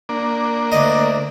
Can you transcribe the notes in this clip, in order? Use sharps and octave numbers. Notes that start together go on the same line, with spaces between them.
A#3 D4
D2 D#5